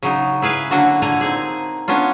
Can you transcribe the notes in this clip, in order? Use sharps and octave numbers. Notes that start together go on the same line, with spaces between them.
C#3 F#3 D#4
E4 G#4 B4 F5
D3 F#3 A#3 D4 F#4
A#2 D3 A#3 G#5 A#5
C4 D#4 G#4
B3 C#4 D4 F4